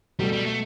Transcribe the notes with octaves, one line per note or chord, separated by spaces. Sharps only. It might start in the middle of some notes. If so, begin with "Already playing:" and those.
B2 F#3 G3 A3
G3
A3